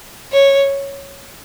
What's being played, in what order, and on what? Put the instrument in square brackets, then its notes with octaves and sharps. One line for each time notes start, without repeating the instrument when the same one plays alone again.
[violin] C#5